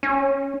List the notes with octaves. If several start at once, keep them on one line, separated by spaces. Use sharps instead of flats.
C#4